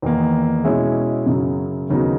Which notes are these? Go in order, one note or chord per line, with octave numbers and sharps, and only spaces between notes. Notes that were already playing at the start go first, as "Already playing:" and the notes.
E2 D#3 A#3
B2 G#3 C#4 E4 G#4
F#2 C#3 F#3
D#2 C#3 F#3 B3 D#4